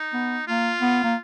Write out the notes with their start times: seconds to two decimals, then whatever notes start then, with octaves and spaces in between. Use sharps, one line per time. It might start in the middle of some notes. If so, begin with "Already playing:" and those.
Already playing: D#4
0.13 B3
0.47 A#3 F4
0.81 B3
1.04 A#3